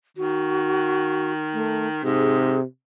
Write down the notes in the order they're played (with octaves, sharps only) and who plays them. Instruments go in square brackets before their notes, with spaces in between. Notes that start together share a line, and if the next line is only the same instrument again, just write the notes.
[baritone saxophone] D#3 [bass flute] F#4
[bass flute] A3
[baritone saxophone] G#2 [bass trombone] C3 [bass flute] G#4